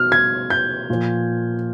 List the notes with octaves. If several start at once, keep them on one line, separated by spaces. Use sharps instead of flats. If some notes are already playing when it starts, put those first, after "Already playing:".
Already playing: B2 F6
G#6
G6
A#2 F3